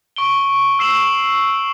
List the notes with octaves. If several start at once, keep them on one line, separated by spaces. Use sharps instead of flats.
C#6 D7 G7
E6 C7 E7 F#7